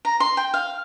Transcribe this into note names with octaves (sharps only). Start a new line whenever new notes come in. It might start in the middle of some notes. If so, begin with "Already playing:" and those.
A#5
C6
G5
F5